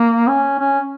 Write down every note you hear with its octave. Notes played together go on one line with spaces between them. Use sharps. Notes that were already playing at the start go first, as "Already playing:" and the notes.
Already playing: A#3
C#4
C#4